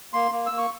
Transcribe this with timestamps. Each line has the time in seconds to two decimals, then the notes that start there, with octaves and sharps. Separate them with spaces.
0.13 A#3 C6
0.31 A#3
0.46 A#3 E6
0.58 C#6